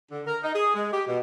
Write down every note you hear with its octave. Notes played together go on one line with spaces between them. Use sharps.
D3
A#4
D#4
G#4
G#3
G4
B2